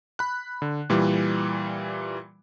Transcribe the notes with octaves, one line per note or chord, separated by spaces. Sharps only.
B5 F#6
D3
A#2 E3 G3